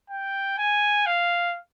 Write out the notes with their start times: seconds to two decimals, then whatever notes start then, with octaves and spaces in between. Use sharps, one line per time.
0.10 G5
0.58 G#5
1.07 F5